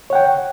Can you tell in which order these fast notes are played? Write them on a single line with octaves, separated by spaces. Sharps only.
C#5 F#5 G5